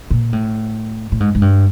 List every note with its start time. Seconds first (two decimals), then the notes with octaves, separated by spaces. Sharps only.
0.11 A#2
0.33 A2
1.12 A2
1.20 G#2
1.35 G#2
1.42 G2